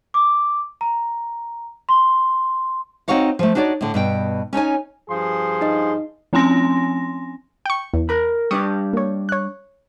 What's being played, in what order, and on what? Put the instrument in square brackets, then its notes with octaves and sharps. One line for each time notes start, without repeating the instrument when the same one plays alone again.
[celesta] D6
A#5
C6
[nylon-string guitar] C4 D#4 F#4 C#5 F5 F#5
F3 A3
D4 D#4 F#4 C#5 D5
A2 D3
G2 B2 G5
C#4 D#4 C#5 G#5
[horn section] G2 F3 C6 [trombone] G#4
[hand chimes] D#4 D#5
[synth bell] F3 C4 C#4 G#5 C6 A#6
[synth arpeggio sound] G5 C#6
E2
[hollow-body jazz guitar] A#4 B5
[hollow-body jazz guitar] G3 D4 D5 [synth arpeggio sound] C#6 D#6
[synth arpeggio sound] A#3 C#5
C#5 F#6